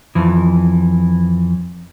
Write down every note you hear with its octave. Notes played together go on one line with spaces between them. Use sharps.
F2 E3